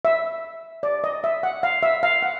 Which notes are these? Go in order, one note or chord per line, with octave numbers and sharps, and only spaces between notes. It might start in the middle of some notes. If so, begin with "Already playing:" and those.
E5
D5
D#5
E5
F#5
F5
E5
F5
F#5